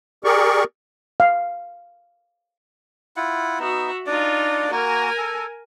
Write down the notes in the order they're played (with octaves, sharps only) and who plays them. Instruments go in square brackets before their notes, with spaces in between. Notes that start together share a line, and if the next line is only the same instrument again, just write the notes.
[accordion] G4 G#4 A#4 D5 C#6
[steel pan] F5
[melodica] E4 F4 F#5
[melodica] B3 D#4 [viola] F#4 E5
[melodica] D4 D5 [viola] D#4 F4
[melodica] A#3 F#4 [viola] A#4 G#5
[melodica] A4